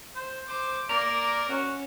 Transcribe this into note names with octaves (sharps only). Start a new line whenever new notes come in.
C5
C5 D6
A#3 A#4 D5
C#4 F#4